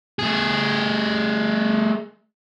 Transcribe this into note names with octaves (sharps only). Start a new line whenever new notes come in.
A3 G#4